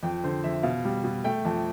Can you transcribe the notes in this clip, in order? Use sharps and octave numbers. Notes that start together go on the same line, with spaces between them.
F2 G5
D3 C5
F2 E5
B2 F5
G3
B2
A3 G5
F2 A5